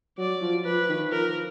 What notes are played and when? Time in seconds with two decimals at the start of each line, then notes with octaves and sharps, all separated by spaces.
0.18 F#3 D5
0.42 F3
0.65 F3 B4
0.89 D#3
1.12 F3 A#4